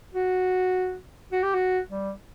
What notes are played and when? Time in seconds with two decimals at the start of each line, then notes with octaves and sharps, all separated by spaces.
0.14 F#4
1.32 F#4
1.43 G4
1.54 F#4
1.91 G3